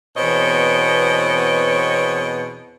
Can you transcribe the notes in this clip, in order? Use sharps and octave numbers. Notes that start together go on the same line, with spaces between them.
E2 B2 C4 C#5 D#5